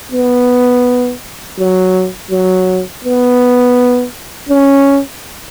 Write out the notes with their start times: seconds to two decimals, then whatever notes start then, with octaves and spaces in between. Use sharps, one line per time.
0.12 B3
1.58 F#3
2.31 F#3
3.04 B3
4.49 C#4